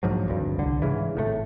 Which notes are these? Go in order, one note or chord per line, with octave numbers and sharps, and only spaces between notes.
A#1 G#2 F3 F#3
G#1 D2 G2
C2 D3
G#2 C#3 E3
G#1 A2 D3 A3